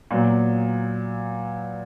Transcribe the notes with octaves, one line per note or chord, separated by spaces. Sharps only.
A#2 F#3 B3